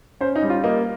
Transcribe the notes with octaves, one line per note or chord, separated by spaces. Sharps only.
C#4 C5
D#4
G3
F4
A#3 D#5